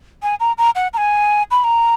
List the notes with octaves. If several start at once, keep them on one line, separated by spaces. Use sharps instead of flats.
G#5
A#5
A#5
F#5
A#5
G#5
B5
A#5